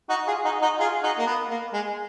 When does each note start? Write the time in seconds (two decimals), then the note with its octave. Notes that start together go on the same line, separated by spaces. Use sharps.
0.09 D#4 F#4
0.27 F4 G#4
0.45 D#4 F#4
0.62 D#4 F#4
0.79 F4 G#4
1.03 D#4 F#4
1.18 A#3
1.27 B3
1.50 A#3
1.73 G#3